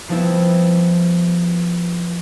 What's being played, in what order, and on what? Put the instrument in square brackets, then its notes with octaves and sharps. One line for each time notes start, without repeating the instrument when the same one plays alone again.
[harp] F3 G3 B3 C4 E4